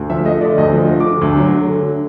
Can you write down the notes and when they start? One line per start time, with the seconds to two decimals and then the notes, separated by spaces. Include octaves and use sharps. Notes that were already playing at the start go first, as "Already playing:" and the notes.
Already playing: D2
0.10 F3 E5
0.25 A3 D#5
0.41 D3 D5
0.58 D2 D#5
0.73 F3
0.89 A3
1.00 D6
1.05 D3
1.21 D2
1.37 F#3
1.53 A3
1.69 D3